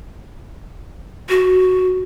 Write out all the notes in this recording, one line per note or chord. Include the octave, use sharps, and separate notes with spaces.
F#4